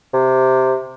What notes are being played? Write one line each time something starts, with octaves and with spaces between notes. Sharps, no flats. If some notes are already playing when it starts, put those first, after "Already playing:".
C3